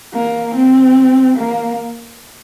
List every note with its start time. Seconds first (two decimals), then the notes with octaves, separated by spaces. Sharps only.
0.14 A#3
0.55 C4
1.37 A#3